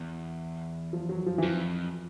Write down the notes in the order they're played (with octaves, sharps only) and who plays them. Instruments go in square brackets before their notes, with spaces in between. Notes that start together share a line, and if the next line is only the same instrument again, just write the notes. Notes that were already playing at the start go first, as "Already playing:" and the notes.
Already playing: [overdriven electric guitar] E2
[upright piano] F3
F#3
F3
E3
[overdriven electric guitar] F2 [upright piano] F3